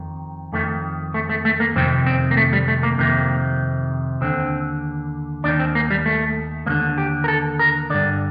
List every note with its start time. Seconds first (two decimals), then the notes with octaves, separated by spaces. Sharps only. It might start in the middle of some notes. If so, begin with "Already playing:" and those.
Already playing: F2 D#3
0.53 F2 D#3 A3
1.14 A3
1.29 A3
1.45 A3
1.60 A#3
1.76 F2 C3 D#3 C4
2.06 C4
2.31 A#3
2.37 A3
2.53 G3
2.68 A3
2.83 A#3
2.98 F2 C3 D#3 A#3
4.21 D#2 D3 C4
5.44 D#2 D#3 D4
5.59 C4
5.75 A#3
5.91 G3
6.06 A3
6.66 D#2 D3 A#3
6.98 G4
7.24 A#4
7.28 A4
7.59 A#4
7.90 G2 D3 D5